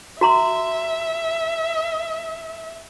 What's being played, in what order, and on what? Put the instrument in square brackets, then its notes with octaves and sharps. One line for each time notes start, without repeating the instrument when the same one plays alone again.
[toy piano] F#4 A#5 C6 [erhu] E5